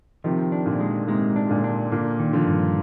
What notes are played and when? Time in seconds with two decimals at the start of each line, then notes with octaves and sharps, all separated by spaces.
0.24 C3 D#3 F3
0.52 D4
0.66 A#2 D3
0.80 G#3
1.08 G#2 C3 G#3
1.36 D4
1.49 A#2 D3
1.64 D4
1.92 A#2 D3 A#3
2.19 D#3
2.33 D3 F3
2.47 G2